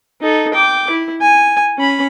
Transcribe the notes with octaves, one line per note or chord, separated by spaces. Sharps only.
D#4 A4
G5 D6
E4
G#5
C#4 B5